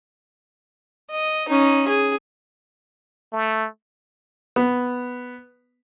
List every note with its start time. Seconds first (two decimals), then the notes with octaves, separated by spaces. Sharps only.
1.11 D#5
1.49 C#4 D#4
1.88 G#4
3.33 A3
4.56 B3